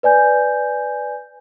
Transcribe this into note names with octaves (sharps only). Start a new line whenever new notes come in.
B4 D5 G#5 G6